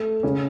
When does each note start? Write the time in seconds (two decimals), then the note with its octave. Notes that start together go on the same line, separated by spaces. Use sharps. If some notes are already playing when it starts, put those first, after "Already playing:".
Already playing: A3
0.23 C#3 G#3 C#4